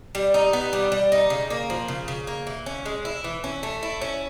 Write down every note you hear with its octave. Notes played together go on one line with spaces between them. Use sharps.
G3
D#4
B3
G3
G3
D#4
C#3
A#3
F3
C#3
C#3
A#3
E3
C#4
G#3
E4
E3
C#4
A3
E4
C#4